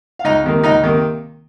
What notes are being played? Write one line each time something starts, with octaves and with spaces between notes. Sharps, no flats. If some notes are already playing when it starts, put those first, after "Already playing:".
F5
C#2 D#4 D#5
C3 D#3 A#3
C#2 D#4 D#5
C3 D#3 A#3